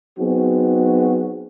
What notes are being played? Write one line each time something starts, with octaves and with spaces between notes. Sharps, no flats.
F#3 B3 C4 D#4 F#4 G#4